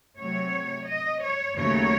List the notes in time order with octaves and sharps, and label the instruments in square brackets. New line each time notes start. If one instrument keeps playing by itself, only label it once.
[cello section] C3 F#3 A3 C#5
D#5
C#5
D#2 C#3 F#3 A3 C#5